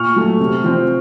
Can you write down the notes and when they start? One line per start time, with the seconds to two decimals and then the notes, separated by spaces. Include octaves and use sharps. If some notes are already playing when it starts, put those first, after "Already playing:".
Already playing: A#2 C#6 F6
0.16 F#3 A3
0.40 C3
0.64 F3 C4